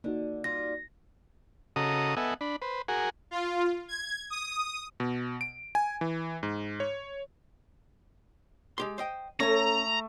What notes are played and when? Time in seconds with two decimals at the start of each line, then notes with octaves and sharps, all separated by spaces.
0.04 D3 A#3 D#4 F#4
0.44 G3 F4 A#6
1.76 C#3 F#4 A4 D#5 A#5 D#6
2.17 B3 A4 D#5 E5 F#5 G#5
2.41 D4 B5
2.62 B4 C5
2.88 F#4 G#4 A#4 F#5 G#5
3.31 F4
3.88 G#6
4.30 D#6
5.00 B2
5.41 D7
5.75 G#5
6.01 E3
6.43 G#2
6.80 C#5
8.78 G#3 G4 C6
8.98 C5 D#5 G5
9.40 A3 C#4 C#5 A#5